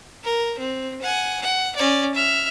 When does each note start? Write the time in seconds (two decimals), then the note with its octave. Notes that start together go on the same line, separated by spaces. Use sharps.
0.24 A#4
0.59 C4
1.02 F#5 G#5
1.42 F#5
1.76 C#4 D5
2.15 E5 F6